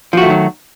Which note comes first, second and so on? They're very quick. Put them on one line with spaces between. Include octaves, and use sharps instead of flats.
F3 F#4 A3 D#3 F#3